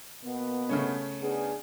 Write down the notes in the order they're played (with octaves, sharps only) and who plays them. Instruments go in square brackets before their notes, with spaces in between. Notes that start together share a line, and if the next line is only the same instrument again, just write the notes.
[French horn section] B2 A#3 B3
[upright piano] C#3 A3 C#4
[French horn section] B3 D4 G#4